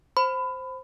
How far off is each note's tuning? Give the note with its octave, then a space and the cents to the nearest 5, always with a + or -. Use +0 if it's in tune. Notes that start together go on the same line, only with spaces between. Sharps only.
C5 +0 B5 +20